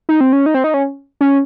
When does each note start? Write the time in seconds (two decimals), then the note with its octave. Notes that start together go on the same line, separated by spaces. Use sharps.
0.09 D#4
0.21 C4
0.33 C#4
0.46 D#4
0.54 C4
0.64 D#4
0.74 C#4
1.21 C#4